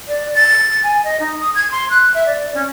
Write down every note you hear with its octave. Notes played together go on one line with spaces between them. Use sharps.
D5
A6
G#5
D#5
D#4
D#6
G#6
C6
F#6
E5
D5
C#4